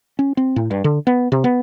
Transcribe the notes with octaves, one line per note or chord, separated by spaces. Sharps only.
C#4
C4
A2
G2
D3
B3
C3
B3